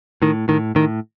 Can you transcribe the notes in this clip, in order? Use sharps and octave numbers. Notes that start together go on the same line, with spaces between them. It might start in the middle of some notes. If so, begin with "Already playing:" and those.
A2 D#3
A2 D#3
A2 D#3